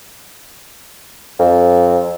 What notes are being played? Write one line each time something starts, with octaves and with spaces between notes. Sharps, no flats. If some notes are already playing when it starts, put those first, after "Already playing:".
F2